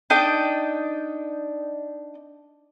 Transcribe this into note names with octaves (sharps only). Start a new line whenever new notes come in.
D4 D#4 D#5 G5